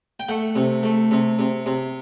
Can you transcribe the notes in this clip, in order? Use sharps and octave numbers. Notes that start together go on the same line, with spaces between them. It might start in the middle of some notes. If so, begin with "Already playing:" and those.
G5
A3 F#5
C3
A3
C3
C3
C3